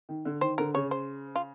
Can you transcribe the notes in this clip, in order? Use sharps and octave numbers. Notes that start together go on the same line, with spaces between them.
D#3
D3
D#3 C5
D3 A#4
C#3 C#5
C5
F4